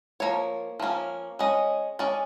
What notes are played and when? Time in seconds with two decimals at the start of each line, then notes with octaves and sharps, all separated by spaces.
0.20 F3 A#3 C#5
0.80 F3 A#3 C#4
1.39 G#3 C#4 D#5
1.99 G#3 C#4 D5